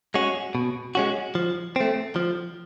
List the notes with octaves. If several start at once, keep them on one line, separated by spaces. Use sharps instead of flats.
G#3 C#4 F#4
B2
G#3 C#4 F#4
F3
A3 C4
F3